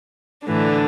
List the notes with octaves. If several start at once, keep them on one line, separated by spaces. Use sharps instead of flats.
A2 D3 E3 D4